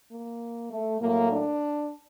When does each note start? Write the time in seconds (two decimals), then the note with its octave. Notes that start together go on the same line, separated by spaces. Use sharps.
0.10 A#3
0.70 A3
1.00 A2 F#3 A3 A#3
1.31 D4